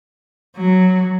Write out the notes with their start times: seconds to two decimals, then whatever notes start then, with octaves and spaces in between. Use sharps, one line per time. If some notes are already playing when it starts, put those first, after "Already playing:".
0.57 F#3